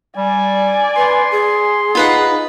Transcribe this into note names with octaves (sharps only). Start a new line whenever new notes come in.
G3 D5 G#5
B4 C6
G#4
D#4 F4 B4 F#5